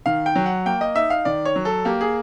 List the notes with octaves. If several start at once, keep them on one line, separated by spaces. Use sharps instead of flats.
D#3 F5
G5
F#3
F#5
A#3 G5
D#5
D#4 E5
F5
D#3 D5
C#5
F#3
A4
A#3 G4
G#4